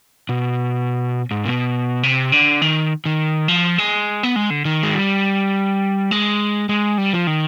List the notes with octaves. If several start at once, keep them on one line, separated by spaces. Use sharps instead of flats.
B2
G#2
B2
C3
D3
D#3
D#3
F3
G#3
B3
G#3
D3
D#3
G#3
G3
G#3
G#3
G3
F3
D#3